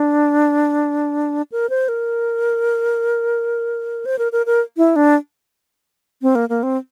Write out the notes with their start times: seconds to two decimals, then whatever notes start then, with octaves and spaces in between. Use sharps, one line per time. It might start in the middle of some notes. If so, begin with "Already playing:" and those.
Already playing: D4
1.52 A#4
1.70 C5
1.89 A#4
4.06 C5
4.19 A#4
4.32 A#4
4.46 A#4
4.77 E4
4.96 D4
6.22 C4
6.35 A#3
6.49 A#3
6.63 C4